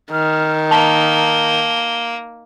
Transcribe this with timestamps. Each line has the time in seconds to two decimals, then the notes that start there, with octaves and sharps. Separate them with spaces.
0.12 D#3 F6
0.71 A#3 A5 G7